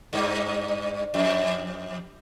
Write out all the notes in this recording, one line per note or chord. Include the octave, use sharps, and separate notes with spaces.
G2
F2